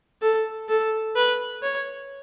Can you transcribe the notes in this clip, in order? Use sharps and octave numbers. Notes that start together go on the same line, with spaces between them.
A4
A4
B4
C#5